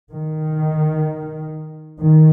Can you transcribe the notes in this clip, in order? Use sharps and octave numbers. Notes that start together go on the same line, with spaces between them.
D#3
D#3